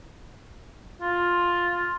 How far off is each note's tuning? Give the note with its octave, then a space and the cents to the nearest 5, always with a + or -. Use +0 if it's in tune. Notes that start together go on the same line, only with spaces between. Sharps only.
F4 +5